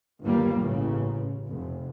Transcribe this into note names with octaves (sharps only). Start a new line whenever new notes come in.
G1 D#2 G3 A#3
A1 C#3
F1